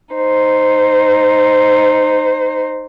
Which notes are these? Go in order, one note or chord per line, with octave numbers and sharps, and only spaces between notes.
D#4 C5